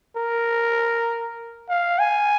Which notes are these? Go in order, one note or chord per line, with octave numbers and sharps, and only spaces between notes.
A#4
F5
G#5